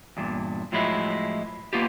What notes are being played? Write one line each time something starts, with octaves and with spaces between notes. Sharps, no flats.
E2 G2 A#2
A2 F3 F#3 G#3 E4
A#3 B3 F4 G4